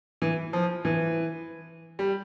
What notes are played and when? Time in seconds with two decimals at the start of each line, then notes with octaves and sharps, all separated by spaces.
0.22 E3
0.53 F3
0.85 E3
1.99 G3